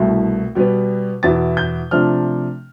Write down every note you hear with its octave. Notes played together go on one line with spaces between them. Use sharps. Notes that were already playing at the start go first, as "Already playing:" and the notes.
Already playing: C2 B2 A3 E4
B2 G3 B3
E2 B2 B3 E4 A6
G6
C3 F3 A3 D4 F6